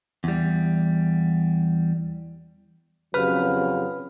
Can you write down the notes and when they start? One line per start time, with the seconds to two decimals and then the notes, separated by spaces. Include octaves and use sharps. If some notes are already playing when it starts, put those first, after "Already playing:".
0.24 E2 G3
3.14 F2 C#3 F#3 G4 B4 F5 B5 F6